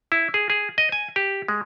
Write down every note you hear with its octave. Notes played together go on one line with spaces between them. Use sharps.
E4
G#4
G#4
D#5
G#5
G4
G#3